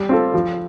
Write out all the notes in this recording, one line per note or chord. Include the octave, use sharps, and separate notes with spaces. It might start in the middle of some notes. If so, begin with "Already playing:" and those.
Already playing: G3
C4 F4 A4
F3